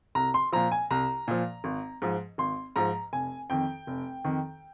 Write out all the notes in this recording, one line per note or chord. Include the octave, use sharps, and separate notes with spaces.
C2 A#5
C6
A#2 F3 A#5
G#5
C2 A#5
A#2 F3
G#1
G#2 F3
G#1 C6
G#2 F3 A#5
F1 G#5
F2 D#3 G5
F1
F2 D#3